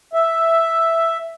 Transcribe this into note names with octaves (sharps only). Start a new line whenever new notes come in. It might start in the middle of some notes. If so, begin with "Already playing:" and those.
E5